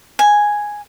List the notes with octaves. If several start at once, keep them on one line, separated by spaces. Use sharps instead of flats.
G#5